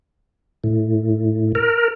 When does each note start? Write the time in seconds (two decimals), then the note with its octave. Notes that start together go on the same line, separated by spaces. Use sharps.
0.64 A2
1.55 A#4